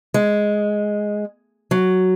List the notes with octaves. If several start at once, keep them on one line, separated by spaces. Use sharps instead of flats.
G#3
F#3